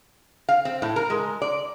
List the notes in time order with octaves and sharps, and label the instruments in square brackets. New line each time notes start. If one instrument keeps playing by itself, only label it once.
[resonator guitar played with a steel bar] F5
C4
A2
A#4
G#3
D5